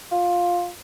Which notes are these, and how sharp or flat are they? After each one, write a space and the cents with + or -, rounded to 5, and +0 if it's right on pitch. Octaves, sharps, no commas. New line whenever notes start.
F4 +10